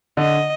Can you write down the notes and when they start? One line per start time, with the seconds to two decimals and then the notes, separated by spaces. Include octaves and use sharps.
0.17 D3 D#5